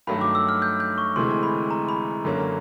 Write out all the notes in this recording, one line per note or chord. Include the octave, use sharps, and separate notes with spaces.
G2 D#3 F#3 A3 B5
D6
E6
F6
G6
G6
C#6
D2 C3 E3 G#3 C6
B5
A#5
B5
F#2 D3 F#3 A#3 C#4